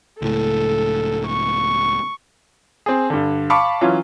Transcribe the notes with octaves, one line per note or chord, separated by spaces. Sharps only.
C#2 A2 A4
C#6
C4 G#4
G2 D3
F5 A5 B5 C#6 D6
E3 F#3 C#4 F4